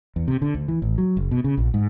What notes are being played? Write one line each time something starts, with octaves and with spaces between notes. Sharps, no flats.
E2
C3
D3
D2
E3
A1
F#3
F#1
B2
C#3
A#1
G#2